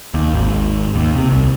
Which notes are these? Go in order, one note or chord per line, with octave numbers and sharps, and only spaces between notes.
D#2
G#1
D#2
C3
C2